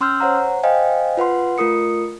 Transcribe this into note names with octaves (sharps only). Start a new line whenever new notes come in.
C#4 C6 E6 F6 G6
C5 C#5 F#5 A#5
C5 D#5 F5 G5 G#5
F4 B4 F#5 C6
A3 F4 A#4 D#6 C#7